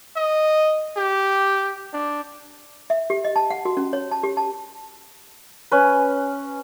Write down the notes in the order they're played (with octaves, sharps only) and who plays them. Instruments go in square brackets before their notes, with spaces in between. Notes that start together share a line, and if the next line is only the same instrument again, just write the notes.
[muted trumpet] D#5
G4
D4
[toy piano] E5
G4
D#5
A5
F#5
F#4
C#4
C#5
A5
G4
A5
[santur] C#4 B4